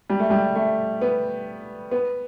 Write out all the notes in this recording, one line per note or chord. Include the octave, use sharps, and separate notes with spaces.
G3
A3
G3
A3
B3
B3